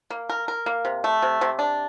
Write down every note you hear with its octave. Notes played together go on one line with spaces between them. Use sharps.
A#3
A#4
A#4
A#3
C3
A3
C3
C3
D4